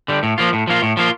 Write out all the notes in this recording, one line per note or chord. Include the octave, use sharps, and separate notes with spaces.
D3 G3
A2
F3 A#3 F4
A2
F3 A#3 F4
A2
F3 A#3 F4